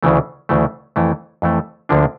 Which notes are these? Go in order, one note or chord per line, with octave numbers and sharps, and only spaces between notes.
D2 C#3 E3 A3
D2 C#3 E3 A3
F2 E3 A3
F2 E3 A3
D2 D3 F3 A#3 D4